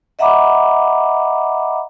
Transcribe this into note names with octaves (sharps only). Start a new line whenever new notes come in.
D#5 E5 F#5 A#5 B5 D6